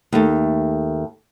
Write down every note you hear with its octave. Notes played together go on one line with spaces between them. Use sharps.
D#2 A3